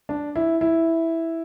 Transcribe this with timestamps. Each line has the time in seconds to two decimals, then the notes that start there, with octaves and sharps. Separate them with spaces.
0.09 D4
0.36 E4
0.61 E4